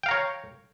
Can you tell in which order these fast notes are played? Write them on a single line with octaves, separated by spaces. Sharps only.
G5 F5 A#5 C#5